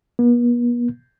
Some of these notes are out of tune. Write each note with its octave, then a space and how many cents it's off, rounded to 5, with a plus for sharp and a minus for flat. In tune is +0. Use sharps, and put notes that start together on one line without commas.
B3 -45